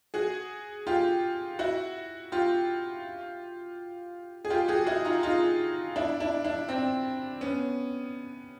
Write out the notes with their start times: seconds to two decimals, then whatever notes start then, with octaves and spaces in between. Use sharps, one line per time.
0.14 F#4 G#4
0.87 F4 G4
1.59 E4 F#4
2.32 F4 G4
4.45 G#4
4.50 F4 G4
4.68 F#4 G#4
4.87 E4 F#4
5.05 D#4 F4
5.23 D#4 F4
5.96 D4 E4
6.20 D4 E4
6.44 D4 E4
6.68 C4 D4
7.41 B3 C#4